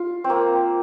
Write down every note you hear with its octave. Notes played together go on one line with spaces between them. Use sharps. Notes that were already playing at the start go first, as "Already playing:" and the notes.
Already playing: F4
C4
A#3